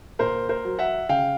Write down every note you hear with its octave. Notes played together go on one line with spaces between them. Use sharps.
A#2 A#4 C5
A#4 C5
F#3
E5 F#5
C#3 F5 G5